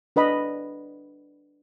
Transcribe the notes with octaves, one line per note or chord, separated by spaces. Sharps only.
D4 B4 D#5 B5